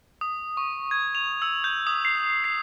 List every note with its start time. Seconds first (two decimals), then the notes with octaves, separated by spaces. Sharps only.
0.21 D#6
0.57 C#6
0.91 G#6
1.15 F7
1.42 E6
1.64 G6
1.87 D#6
2.05 C7
2.44 C7